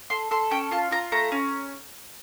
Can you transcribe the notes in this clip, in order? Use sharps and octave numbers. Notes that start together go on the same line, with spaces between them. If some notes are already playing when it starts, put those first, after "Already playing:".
A4 C6
A4 C6
C#4 G5
F4 A5
F4 A#5
A3 A#5
C#4